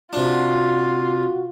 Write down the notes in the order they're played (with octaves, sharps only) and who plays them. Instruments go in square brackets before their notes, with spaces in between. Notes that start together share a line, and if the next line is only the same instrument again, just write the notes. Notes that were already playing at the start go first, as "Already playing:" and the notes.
[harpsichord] C3 D4 [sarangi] F4 [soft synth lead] F#4